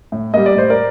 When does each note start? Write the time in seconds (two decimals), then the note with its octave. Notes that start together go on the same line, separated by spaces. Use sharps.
0.12 A2
0.34 G3 A#3 D#5
0.46 D5
0.56 A2 C5
0.70 A#4 D5